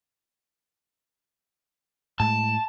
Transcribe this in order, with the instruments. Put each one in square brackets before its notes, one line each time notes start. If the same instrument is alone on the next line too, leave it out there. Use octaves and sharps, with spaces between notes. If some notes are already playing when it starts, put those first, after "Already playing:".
[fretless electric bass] A2 G#3 [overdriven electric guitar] A5